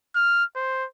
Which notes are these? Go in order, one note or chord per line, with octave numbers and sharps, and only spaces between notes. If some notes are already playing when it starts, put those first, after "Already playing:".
F6
C5